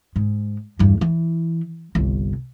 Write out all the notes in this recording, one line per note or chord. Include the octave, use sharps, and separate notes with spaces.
G#2
E2 G2
E3
G1 C2